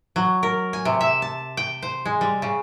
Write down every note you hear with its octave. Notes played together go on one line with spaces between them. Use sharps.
F#3
A#4
G#5
C3
E5
A5
G5
C5
G#3
G3
C#3